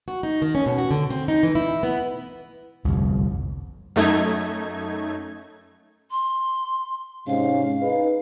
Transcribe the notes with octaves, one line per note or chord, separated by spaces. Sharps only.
F#4
D#4
D#3
C#4
B2
F#4
D3
C4
D#4
E3
E4
B3
G1 C2 F2
F#2 A3 D#4 G#6
C6
G#2 C3 C#4 F5
D#4 G#4 B4